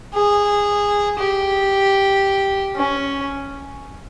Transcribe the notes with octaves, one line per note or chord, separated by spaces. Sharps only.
G#4
G4
C#4